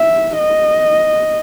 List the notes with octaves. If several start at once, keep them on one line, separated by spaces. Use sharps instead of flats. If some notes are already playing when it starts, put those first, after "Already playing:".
Already playing: E5
D#5